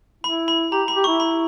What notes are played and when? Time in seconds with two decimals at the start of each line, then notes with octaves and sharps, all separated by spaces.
0.24 E4 B5
0.48 B5
0.72 G4 A#5
0.88 B5
0.96 G4
1.04 E4 C#6
1.20 B5